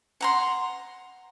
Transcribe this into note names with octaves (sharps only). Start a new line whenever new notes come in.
F#5 A#5 C6